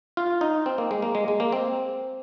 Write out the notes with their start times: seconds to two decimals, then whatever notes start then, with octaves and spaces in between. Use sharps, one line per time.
0.17 F4
0.41 D#4
0.66 C4
0.78 A#3
0.91 G#3
1.02 A#3
1.15 G#3
1.28 G#3
1.40 A#3
1.53 C4